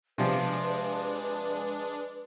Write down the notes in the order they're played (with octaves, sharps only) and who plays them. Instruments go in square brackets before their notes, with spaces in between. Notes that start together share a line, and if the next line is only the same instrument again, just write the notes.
[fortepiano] C3 F3 [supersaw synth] G#3 D4 [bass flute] B4